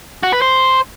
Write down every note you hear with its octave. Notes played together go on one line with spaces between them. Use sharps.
F#4
B4
C5